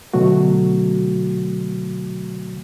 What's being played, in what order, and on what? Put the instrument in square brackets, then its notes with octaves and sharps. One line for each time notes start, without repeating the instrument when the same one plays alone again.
[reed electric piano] B2 D3 F#3 A3 F#4